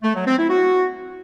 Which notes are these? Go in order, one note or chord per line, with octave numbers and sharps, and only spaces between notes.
A3
F#3
C4
E4
F#4